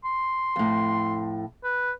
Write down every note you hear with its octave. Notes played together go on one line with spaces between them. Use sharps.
C6
F2 A2
B4